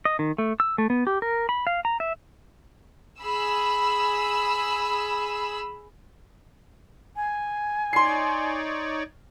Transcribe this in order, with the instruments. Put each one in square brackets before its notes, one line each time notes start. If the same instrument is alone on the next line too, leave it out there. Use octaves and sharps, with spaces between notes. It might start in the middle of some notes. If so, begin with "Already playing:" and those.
[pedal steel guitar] D#5
D#3
A3
E6
A3
B3
G4
A#4
B5
F5
A#5
E5
[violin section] G#4 B5 E6
[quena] G#5
[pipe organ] D#4 C#5 D5 [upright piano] C6 C7